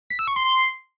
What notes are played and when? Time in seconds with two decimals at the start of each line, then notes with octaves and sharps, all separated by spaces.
0.10 B6
0.19 E6
0.28 C#6
0.36 C6